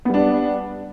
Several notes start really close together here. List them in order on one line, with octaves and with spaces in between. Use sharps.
B3 G3 D4